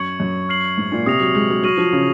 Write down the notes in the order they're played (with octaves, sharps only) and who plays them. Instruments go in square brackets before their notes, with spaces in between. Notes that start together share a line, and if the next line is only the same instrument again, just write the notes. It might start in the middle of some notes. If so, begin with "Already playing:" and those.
Already playing: [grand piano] F#2 [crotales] C#6 G#6 C#7 F#7
[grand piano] F#2
[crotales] F6 C7 F#7
[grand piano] G#2
A#2
[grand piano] C3 [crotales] D#6 A#6 F7
[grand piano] F#3
G#3
F#3
[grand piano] F#3 [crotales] C#6 F6 A#6 D#7 F#7
[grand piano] F3
C#3